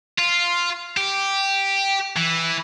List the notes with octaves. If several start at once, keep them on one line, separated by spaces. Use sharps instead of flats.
F4
G4
E3